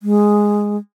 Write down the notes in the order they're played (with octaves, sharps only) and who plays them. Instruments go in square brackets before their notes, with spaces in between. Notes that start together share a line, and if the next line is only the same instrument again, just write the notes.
[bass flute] G#3